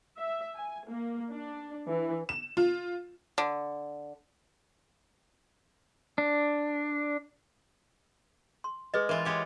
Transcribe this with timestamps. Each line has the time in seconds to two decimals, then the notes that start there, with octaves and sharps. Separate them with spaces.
0.18 E5
0.55 G#5
0.89 A#3
1.30 D4
1.89 E3
2.29 E7
2.57 F4
3.38 D3
6.18 D4
8.64 C6
8.94 G#3 G#4 B4 D#5
9.09 E3 F4 A#4
9.25 G#3 G4 C#5